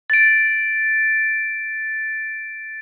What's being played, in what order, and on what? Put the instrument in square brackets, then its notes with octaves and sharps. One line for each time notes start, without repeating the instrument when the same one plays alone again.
[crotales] A6 D7